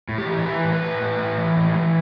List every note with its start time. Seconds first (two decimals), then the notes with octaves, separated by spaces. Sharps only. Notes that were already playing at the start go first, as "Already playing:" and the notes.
0.09 A2
0.18 G4
0.27 E3
0.46 E3 B4
0.64 A2
0.73 B4
0.82 A2
1.02 A2
1.19 A2
1.38 E3
1.56 A2
1.75 E3